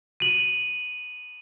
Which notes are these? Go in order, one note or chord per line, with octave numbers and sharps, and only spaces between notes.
D#7 F#7